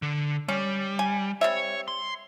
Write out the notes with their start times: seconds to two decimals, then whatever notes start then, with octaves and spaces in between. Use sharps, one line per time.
0.02 D3
0.48 G3 C#4
0.99 G#5
1.41 G3 C4 C#5 E5
1.88 C6